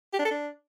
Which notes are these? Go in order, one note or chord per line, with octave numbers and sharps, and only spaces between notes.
G4
D4
A4
D4